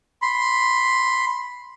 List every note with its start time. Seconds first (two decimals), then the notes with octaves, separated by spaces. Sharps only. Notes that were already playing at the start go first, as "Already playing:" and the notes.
0.22 B5 C6